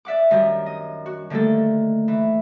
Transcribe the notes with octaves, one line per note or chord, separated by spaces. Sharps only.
D5 E5 F#5 D6
F#2 D#3 G3 D4 D#4 G4
D#5 D#6
F#4
D3 D#3 G3 A3 A#3 A4
E3